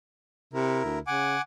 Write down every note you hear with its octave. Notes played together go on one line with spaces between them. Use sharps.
C3 E4 A#4
D2
C#3 F#5 G#5 D6